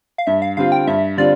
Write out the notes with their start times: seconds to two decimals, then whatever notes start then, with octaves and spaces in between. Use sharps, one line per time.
0.18 F5
0.27 G2 E5
0.42 F5
0.57 D3 G3 C4 F4 F5
0.72 G5
0.87 G2 E5
1.17 D3 G3 C4 F4 D5